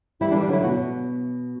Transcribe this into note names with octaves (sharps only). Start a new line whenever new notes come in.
E3 G3 E4
D4
E3 G3
D4
D3 F#3 E4
B2 F#4